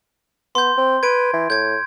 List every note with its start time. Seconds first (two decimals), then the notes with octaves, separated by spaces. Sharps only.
0.55 B3 C6 G6
0.77 C4
1.03 B4 G#6 D7
1.33 E3
1.50 A2 G6 G#6